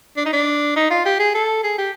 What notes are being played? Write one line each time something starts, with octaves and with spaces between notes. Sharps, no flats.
D4
D#4
D4
D#4
F4
G4
G#4
A4
G#4
G4